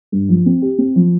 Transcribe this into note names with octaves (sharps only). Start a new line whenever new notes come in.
G2
F3
C4
G4
C4
F3